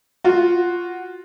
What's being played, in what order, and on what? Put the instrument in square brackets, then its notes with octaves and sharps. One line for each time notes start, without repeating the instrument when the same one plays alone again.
[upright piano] F4 F#4